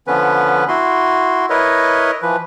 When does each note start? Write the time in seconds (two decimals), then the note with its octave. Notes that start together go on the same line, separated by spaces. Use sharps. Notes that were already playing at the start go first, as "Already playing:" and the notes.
0.07 D3 F3 B3 C#4 B4
0.69 E4 F#4 C6
1.50 E4 A#4 B4 C#5 D#5
2.22 E3 F3 B4